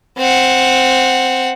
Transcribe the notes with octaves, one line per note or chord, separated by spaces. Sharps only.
C4 F#5